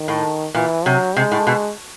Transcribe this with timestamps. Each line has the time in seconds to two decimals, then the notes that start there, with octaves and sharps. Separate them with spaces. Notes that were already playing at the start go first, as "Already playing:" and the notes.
Already playing: D#3
0.08 A2
0.55 A#2 E3
0.85 C3 F#3
1.16 C3 G#3
1.32 A2
1.47 B2